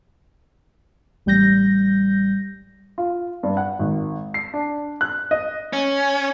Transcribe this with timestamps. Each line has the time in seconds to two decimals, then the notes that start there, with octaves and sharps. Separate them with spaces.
1.26 A1 G3 G6 A#6
2.98 F4
3.43 G2
3.57 F#5
3.79 G#1
4.34 C7
4.54 D4
5.01 F#6
5.31 D#5
5.73 C#4